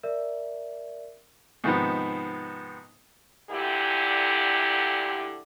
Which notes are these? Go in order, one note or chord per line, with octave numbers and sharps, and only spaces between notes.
A#4 D5 E5
G#2 C3 D#3 F3 B3
D2 A#2 D3 E4 G4